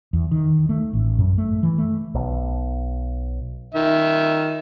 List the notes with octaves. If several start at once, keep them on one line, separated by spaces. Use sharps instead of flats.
E2
D#3
A3
A1
F#2
A3
E3
A3
B1
D#3 E5